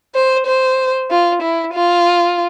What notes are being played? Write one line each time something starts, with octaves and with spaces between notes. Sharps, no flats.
C5
C5
F4
E4
F4